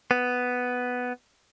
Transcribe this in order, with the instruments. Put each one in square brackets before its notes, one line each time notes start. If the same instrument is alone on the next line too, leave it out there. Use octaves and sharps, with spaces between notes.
[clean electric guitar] B3